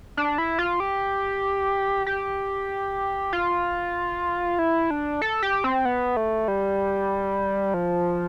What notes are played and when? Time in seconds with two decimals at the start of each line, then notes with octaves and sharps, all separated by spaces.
0.17 D4
0.38 E4
0.59 F4
0.80 G4
2.06 G4
3.33 F4
4.59 E4
4.91 D4
5.22 A4
5.43 G4
5.64 C4
5.85 B3
6.17 A3
6.48 G3
7.74 F3